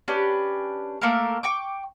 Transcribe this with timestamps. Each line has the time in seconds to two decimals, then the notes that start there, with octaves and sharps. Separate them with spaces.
0.08 C#4 D4 G4 B4
1.01 A3 A#3 A4 A#4
1.43 G5 C#6 D6